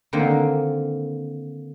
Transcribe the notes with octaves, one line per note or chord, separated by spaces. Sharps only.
D3 D#3 A#3 C4